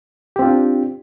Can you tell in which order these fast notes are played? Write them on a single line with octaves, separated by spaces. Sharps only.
G4 C4 F4 D4